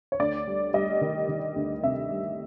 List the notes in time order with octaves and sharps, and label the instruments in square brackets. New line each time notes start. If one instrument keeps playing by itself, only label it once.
[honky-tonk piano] C#5
D2 D5
G3
G3 D#5
D#3
D#3
D2
C3 E5
G3